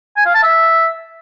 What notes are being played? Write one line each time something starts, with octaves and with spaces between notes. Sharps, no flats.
G#5
F5
A5
E5